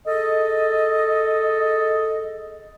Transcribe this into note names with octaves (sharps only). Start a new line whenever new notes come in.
G#4 A4 D#5